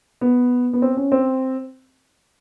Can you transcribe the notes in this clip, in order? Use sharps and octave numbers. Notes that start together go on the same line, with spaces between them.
B3
B3
C4
C#4
C4